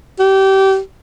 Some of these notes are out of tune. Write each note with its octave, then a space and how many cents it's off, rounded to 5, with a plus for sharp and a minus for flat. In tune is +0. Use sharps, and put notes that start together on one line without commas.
G4 -25